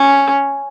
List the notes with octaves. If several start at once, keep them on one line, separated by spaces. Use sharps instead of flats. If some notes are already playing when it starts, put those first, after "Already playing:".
Already playing: C#4